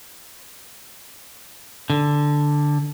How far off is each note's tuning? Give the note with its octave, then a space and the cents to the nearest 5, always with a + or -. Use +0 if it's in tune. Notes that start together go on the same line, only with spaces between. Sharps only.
D3 +0